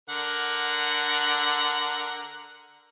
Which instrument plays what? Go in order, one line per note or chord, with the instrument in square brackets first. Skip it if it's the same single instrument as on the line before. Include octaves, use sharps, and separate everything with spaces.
[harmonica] D3 A#4 F#5